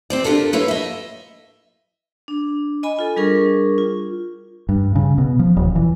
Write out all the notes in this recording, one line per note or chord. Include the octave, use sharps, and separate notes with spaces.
C4 C5 D5
D4 F4 G4 A4 A#4
A#3 F4 A4 B4 C#5 E5
D#5 E5
D4
D#5 G#5 B5
F4 A4
G3 D4 G#4 A#4 C#6
F4
G2
C#3
B2
F3
D#1
E3